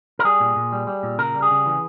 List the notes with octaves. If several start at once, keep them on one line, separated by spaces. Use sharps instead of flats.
A#4
G3 G#4
A#2
A#2
G3
G3
A#2
C#3 A#4
G3
G#4
C#3
E3